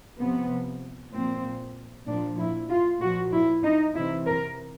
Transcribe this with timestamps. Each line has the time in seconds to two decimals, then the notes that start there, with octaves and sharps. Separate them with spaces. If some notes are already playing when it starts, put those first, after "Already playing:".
0.19 C3 F3 B3
1.13 A#2 F3 C4
2.07 A#2 F3 D4
2.38 E4
2.70 F4
3.01 A#2 F3 F#4
3.33 E4
3.64 D#4
3.95 C3 E3 E4
4.26 A#4